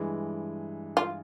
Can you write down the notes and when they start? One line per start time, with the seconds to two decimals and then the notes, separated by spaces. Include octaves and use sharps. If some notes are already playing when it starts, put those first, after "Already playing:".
Already playing: G2 E3 G#3
0.97 F4